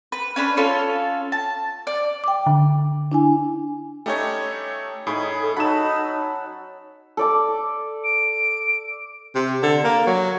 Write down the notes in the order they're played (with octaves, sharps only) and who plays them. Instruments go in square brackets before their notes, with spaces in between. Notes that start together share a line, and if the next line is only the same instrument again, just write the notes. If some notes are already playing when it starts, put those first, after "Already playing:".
[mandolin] B4
C#4 D4 B4 B5
C#4 F4 A4 C#5
A5
D5
[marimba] G5 D6
[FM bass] D3
[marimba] D4 E4 G#5
[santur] G3 C#4 E5 [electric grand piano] A3 D#4 C#5
[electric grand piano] A2 B5 [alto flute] D#4 [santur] G#4 C#5 G#5
[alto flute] A4
[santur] F#3 A4 F#5 [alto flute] D#4 [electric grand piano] B5 E7
[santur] A4 D5 D6
[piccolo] D7
[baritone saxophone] C3
D3
A#3
F#3